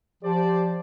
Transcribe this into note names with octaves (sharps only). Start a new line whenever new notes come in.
F3 G4 C5 D5